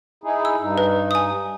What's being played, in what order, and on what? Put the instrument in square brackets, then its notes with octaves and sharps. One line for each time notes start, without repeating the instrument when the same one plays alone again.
[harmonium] D#4 E4 G#4
[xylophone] E6
[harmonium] G2 D#4
[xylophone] B4
G#5 D#6